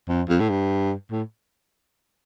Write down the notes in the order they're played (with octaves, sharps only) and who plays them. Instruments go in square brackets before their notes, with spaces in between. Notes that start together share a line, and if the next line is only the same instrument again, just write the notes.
[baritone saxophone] F2
F2
A2
G2
A2